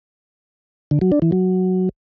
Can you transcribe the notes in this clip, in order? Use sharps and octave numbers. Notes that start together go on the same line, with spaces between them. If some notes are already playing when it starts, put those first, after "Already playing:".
D3
F#3
D4
E3
F#3